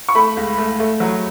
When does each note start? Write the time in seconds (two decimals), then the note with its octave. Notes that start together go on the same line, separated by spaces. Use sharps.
0.09 C#6
0.15 A3 B5
0.37 C#2
0.58 A3
0.80 A3
1.00 F#3